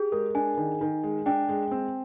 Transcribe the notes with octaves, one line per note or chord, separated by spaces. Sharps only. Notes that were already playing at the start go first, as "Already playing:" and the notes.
Already playing: G4 G#4
G#3 A#4
D4 G#5
D#3
D#3
G#3
D4 G5
G#3
C4